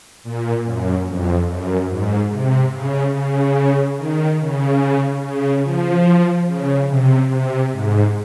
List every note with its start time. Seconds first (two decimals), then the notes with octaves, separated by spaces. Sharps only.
0.23 A#2
0.64 F#2
1.06 F2
1.47 F#2
1.89 G#2
2.30 C3
2.72 C#3
3.14 C#3
3.97 D#3
4.39 C#3
5.22 C#3
5.63 F3
6.46 C#3
6.88 C3
7.30 C3
7.72 G#2